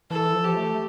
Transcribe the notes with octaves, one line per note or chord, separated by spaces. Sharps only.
E3 A4
F3
G4
A3